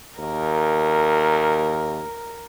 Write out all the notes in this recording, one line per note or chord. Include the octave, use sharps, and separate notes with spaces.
D#2 A#4